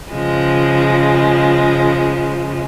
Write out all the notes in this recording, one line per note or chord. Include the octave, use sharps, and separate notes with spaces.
C#3 F3 G#3